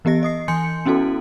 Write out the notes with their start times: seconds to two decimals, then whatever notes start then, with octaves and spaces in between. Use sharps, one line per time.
0.05 E3 B3 G4 D#5 A#6
0.23 D#5 D#6 C7
0.48 E3 G#5 C6 G6 C#7
0.86 B3 C#4 E4 F#4 A4